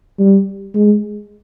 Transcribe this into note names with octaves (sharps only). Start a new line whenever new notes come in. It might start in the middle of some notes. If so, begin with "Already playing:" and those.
G3
G#3